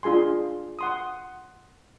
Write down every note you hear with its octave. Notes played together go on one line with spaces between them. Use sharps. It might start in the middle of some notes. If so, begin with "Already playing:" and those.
D4 F4 G#4 G#5 C6
F#5 C6 D#6